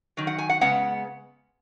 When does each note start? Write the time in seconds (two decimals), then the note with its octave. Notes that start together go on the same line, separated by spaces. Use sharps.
0.17 D#3 F#3
0.27 F#5
0.38 G#5
0.49 F#5
0.61 C#3 G#3 B3 F#5